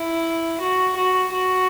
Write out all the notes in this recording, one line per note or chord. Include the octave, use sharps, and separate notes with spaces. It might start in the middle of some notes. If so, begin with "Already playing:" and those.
Already playing: E4
F#4
F#4
F#4